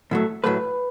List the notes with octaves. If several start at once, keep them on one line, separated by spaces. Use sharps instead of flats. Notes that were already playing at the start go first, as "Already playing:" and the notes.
A2 F#3 A3
A2 F#3 A3 B4